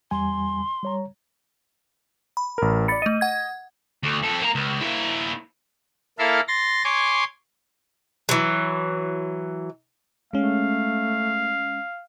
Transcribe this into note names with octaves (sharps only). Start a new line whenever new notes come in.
E2 G3 G#5 C6
G3 C#5 A#5
B5
A1 A#4
D5 B5 A6 C#7
A3 D#5 D#7
F#5 G#6
D2
F2 A4
A#3 A#5
C#2
A#3 E4
A#3 E4 A4 A#4 E5 F5
C6 A6 A#6
C#5 G#5 C6 D6
E3 F#3
G#3 A3 C#4 F5